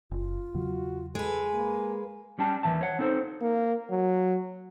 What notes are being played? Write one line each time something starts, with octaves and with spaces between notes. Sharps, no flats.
F#1 F4
E2 C#3 F#3 F#4
G#3 A4 B4 G#5
A#3
G3 C#4 G5 A5
D#2 C3 E3 E5 A5
C#5 F#5
C4 D#4 A4 C5
A#3
F#3